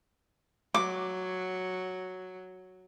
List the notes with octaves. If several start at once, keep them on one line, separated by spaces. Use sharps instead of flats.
F#3 D6